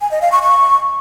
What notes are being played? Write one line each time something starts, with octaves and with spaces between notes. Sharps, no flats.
G#5
D#5
F5
C#6
C#6